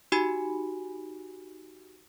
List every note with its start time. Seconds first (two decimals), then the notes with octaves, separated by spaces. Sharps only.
0.12 D#4 F#4 G4 G#5 B5